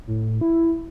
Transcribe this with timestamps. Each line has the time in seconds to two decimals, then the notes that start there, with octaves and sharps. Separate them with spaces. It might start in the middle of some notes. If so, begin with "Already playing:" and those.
0.07 A2
0.41 E4